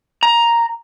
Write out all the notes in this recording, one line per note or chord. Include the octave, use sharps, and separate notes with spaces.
A#5